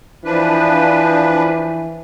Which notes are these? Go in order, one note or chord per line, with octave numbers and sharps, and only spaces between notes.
E3 F3 D4 B4